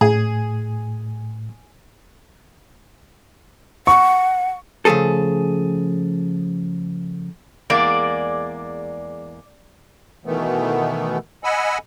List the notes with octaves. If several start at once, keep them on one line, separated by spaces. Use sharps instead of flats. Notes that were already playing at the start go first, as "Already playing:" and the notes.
A2 G#4
F#5 C#6
C#3 F3 A3 G#4 A4
E2 G#3 A#3 D5
B2 D#3 E3 A3 B3
D#5 F#5 G#5 B5 E6